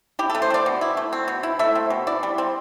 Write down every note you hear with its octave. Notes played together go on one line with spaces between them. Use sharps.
E4 G4
A4
A3
C5
C4 D5
B2
E4
A3
C4
B2
E4
A3 E5
C4
B2
E4 D5
G3
C4